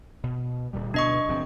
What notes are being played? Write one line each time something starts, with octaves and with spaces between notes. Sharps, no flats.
B2
D1 A#2 G3
D1 B2 B3 D4 D#5 C#6
F#1 F3 C4